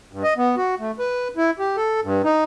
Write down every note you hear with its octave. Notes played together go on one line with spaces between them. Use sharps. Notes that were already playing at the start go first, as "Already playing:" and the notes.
G2
D#5
B3
F#4
A3
B4
E4
G4
A4
G2
D#4